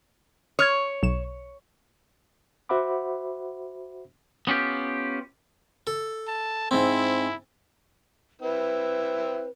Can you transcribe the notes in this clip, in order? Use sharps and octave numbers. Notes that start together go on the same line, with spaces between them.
C#5 D#6 F6 G#6
B1 E7
F#4 C5 E5 F#5 B5 D6
B3 C#4 F4 G4
A4
A5
G#2 C4 E4
C4 E4 B4